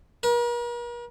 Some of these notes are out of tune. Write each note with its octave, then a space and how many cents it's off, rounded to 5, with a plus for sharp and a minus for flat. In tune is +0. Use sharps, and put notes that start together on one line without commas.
A#4 +45